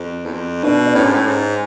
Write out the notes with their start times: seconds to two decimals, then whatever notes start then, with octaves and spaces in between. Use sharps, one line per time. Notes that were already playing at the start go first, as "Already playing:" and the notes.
Already playing: F2
0.25 E2
0.32 F2
0.63 B2 D4 D5
0.86 D5
0.95 A2 C#4 C#5
1.04 G#2
1.13 A2
1.27 G#2